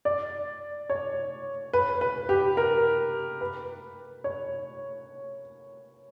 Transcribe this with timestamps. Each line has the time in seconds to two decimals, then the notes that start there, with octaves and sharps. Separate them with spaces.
0.05 D5
0.90 C#5
1.73 B4
2.01 B4
2.29 G4
2.57 A#4
3.41 B4
4.24 C#5